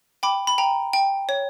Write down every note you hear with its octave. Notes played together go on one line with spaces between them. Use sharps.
G5 B5 D6
B5
G5 A#5
G5
C#5